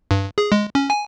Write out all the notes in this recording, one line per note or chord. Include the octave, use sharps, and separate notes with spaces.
G2
G#4
G#3
C#4
G#5